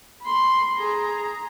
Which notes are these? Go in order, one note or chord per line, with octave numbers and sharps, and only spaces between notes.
B5 C6
G#4 A#5